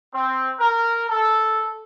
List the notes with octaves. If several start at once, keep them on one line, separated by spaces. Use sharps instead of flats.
C4
A#4
A4